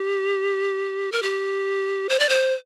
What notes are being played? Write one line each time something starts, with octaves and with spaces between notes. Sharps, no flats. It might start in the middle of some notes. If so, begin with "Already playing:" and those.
Already playing: G4
A#4
G4
C5
D5
C5